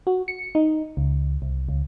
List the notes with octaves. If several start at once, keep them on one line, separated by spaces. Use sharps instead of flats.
F#4
C#7
D#4
C#2
C2
C#2